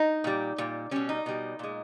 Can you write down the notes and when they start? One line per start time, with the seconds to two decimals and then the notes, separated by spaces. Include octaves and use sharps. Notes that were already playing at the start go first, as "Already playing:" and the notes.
Already playing: D#4
0.24 A#2 G3
0.58 A#2 G3
0.91 B2 G3 C#4
1.09 D#4
1.26 B2 G3
1.59 A#2 G#3